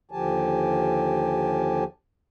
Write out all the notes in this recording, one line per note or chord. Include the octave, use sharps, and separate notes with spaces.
D#2 D3 F3 G4 G#5 A5